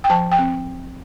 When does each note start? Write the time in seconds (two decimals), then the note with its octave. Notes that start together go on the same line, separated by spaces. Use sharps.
0.04 G5
0.10 F3 A5
0.32 G5
0.39 C4